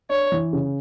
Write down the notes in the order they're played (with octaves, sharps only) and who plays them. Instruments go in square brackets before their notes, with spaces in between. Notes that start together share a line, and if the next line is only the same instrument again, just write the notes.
[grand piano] D4 [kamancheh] C#5
[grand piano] E3
C#3